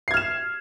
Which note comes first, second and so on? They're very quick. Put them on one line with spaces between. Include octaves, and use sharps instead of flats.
C7 G#6 F6 E7